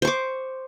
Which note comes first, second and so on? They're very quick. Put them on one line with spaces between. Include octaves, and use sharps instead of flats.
C5 C#6 D6